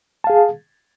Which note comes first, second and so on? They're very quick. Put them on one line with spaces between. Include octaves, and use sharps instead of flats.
A5 F5 G#4